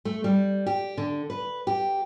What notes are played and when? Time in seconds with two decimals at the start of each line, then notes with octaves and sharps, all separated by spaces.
0.05 A3
0.24 G3
0.66 G4
0.98 D3
1.30 B4
1.67 G4